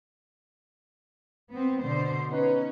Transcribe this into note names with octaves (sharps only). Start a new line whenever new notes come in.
B3 C4
B2 D3 C5
B3 C#4 D#4 B4